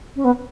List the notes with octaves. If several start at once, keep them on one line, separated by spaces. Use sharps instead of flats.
C#4
B3